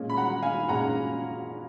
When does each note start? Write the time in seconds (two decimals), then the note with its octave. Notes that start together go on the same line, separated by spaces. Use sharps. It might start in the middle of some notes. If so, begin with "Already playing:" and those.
Already playing: A#2 G#3 C#4
0.10 B5
0.17 F#5 A#5
0.42 F5 G#5
0.68 A#2 G#3 C#4 F#5 A#5